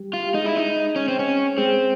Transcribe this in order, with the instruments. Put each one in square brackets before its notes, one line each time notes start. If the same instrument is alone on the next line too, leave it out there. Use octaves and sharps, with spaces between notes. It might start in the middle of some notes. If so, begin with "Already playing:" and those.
Already playing: [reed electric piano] G3 G4
[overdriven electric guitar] F4
[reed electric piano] G4
[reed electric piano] G#3 G#4 [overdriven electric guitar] D#4
[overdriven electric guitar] E4
D#4
C#4
C4
C#4
[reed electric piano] G#3 G#4 [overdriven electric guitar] C4